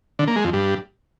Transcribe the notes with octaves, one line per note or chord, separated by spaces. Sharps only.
D3
A#3
G#3
F2
G2